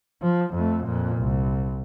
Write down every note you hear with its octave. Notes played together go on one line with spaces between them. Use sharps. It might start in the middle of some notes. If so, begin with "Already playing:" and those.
F3
F2 A3
F2 A#2
C2